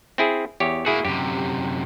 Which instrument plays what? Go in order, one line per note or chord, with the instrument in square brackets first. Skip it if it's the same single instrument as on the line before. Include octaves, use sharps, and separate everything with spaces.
[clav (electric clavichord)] C4 E4 G#4
E2 G4 C#5
[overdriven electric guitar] A#3 F#4 [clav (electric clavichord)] E4 G#4
[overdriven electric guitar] F#2 C3 [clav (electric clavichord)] G4